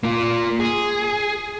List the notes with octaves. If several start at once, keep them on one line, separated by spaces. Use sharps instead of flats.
A#3 F4
G#4